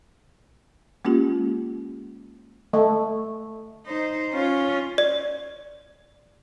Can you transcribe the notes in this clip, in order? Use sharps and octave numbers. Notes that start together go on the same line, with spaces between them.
G#3 A#3 C#4 F4 G4
A3
D#4 C5
C#4 F4
D5